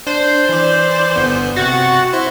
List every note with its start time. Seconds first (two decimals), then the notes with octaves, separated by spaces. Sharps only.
0.07 D4 C5
0.49 E3 D5
1.16 G1 B3
1.56 C3 F#4 F#5 A6
2.13 E4 C5